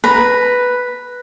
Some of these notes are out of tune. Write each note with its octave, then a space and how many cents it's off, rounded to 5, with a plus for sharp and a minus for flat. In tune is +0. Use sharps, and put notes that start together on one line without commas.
B4 +0 A#5 +0